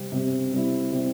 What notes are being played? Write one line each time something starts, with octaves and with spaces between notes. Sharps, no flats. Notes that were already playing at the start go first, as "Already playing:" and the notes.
Already playing: C3 G3 C4
C3 G3 C4
C3 G3 C4 E4
C3 G3 C4 E4